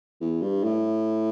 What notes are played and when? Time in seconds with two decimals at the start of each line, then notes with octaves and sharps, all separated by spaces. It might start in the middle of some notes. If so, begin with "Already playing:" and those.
0.21 E2
0.42 G2
0.64 A2